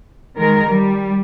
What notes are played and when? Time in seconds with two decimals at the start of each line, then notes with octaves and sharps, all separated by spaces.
0.37 D#3 G#3 A#4
0.70 G3